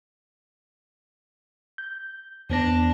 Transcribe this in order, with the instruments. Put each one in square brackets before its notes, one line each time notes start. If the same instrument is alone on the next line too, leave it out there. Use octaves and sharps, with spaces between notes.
[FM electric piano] G6
[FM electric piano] E2 B3 A#6 [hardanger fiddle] D4